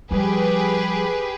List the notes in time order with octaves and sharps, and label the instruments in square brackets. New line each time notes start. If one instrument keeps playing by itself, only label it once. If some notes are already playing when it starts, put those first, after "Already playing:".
[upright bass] F3 G3 [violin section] G4 G#4 B4